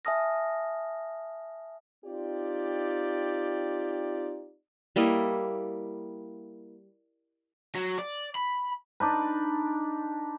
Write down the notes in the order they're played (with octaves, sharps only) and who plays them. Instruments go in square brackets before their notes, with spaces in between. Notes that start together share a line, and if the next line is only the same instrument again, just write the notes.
[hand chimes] E5 G#5 A5 D#6 F6 A#6
[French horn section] C4 D#4 F4 G4 D5
[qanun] G3 A#3 E4 D#5
[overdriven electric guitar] F#3
D5
B5
[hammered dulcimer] D4 D#4 B4